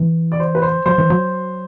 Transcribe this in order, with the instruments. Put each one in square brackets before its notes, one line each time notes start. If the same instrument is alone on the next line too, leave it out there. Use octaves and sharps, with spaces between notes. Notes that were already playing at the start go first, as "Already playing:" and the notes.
Already playing: [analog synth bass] E3
[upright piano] D5
C5
B4
C5
[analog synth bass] F#3 [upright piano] C5
[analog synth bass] E3
F#3